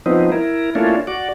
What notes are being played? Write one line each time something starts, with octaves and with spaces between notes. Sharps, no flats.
F3 B3 C4 D#4
E4 A#4
A3 A#3 C#4 D4 E4 F4
F#4 D5